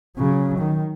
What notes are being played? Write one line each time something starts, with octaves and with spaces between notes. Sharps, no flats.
C#3 F#3
D#3